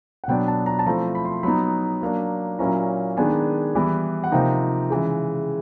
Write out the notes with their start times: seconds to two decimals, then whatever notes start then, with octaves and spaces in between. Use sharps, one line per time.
0.24 F#5
0.28 B2 F#3 B3 D4 G5
0.48 A5
0.66 A#5
0.79 A5
0.86 F3 A3 C4 E4 A#5
1.15 B5
1.25 C6
1.43 F#3 B3 D#4 B5
2.02 F#3 A#3 D4
2.59 A#2 F#3 A#3 C#4 E4 A#5
3.17 D#3 G#3 B3 D4 G#5
3.75 E3 G3 B3 E4
4.24 F#5
4.32 C3 F3 A#3 D#4 G5
4.90 C#3 E3 G#3